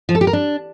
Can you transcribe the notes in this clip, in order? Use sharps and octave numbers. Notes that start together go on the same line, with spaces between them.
F3
A4
G4
A#4
D4